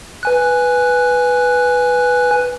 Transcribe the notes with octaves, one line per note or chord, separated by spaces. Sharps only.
B4 G#5 F#6